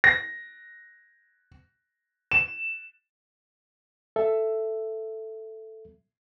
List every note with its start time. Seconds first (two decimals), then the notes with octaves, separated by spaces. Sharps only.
0.04 A#6
2.31 E7
4.16 A4 E5